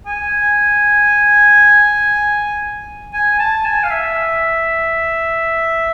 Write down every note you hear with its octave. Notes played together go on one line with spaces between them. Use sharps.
G#5
G#5
A5
G#5
F5
E5